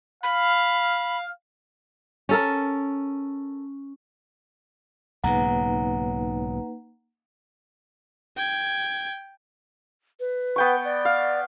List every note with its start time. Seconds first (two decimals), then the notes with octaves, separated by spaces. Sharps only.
0.23 F5 B5
2.29 C#4 A4 A#4
5.24 B1 G#2 C#3 A#3 D#4 B4 F#5 A#5
8.36 G5 G#6
10.20 B4
10.56 B3 G5 C#6
10.85 D5
11.05 F5